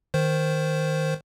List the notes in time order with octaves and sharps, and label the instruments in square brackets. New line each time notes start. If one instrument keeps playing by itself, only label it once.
[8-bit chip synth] D#3 C5